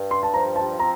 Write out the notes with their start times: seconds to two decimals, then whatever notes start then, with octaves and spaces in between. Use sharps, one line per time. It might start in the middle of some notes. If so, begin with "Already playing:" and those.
Already playing: G2
0.11 C6
0.23 A5
0.34 F3 A#5
0.56 A5
0.78 C4 A#5